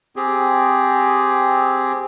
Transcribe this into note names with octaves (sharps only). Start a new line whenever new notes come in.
C4 G4 G#4